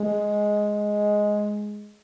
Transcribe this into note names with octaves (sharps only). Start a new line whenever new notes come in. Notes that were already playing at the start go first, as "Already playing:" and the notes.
Already playing: G#3